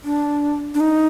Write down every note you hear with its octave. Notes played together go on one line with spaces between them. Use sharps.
D4
D4
D#4